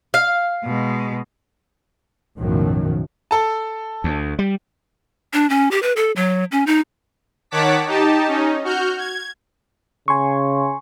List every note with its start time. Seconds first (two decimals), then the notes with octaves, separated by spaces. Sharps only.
0.14 F5
0.64 B2 G#3
2.38 B1 F#2 A2 D#3 F3 F#3
3.31 A4 A5
4.04 D2
4.39 G3
5.33 D4
5.50 C#4
5.71 G4
5.83 B4
5.96 A4
6.16 F#3
6.52 C#4
6.67 D#4
7.51 D#3 C#5 F#5 A5 D6 B6
7.87 D#4 G4 A5
8.28 C#4 D#4
8.64 F#4 F6 G6
8.98 G#6
10.08 C#3 G#5 C6 C#6